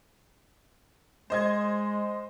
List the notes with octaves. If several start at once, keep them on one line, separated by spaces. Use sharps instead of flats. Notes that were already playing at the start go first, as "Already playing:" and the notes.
G#3 C5 D#5 G#6